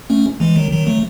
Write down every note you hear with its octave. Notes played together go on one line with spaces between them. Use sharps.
A3 C#4
E3 G#3
D#3 F#3
D#3 F#3
F#3 A3